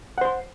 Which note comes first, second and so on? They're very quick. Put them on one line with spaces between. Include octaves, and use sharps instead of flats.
F#5 C5 C6